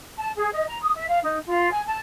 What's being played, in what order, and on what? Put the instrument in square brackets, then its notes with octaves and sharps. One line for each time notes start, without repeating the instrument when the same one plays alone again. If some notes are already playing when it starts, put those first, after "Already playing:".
[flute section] A5
G#4
D#5
A#5
D#6
E5
F5
D#4
F4
G#5
A5